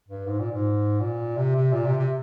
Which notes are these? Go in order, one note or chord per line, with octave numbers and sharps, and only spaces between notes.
G2
G#2
A#2
G#2
A#2
C3
C3
A#2
C3
C3